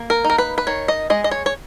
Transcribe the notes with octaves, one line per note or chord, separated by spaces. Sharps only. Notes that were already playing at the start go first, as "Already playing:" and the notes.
Already playing: A#3
A#4
D#4
A#4
B4
B4
D#3 C#5
D#5
G#3 D#5
D#5
C#5
C#5